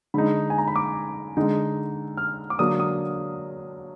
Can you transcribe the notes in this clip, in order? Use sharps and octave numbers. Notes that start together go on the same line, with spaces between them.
D3 G#3 D#4 B5
G#5
A#5
B5
D6
D3 G#3 D#4
F6
D6
D3 F#3 A#3 D4 D#6
D#6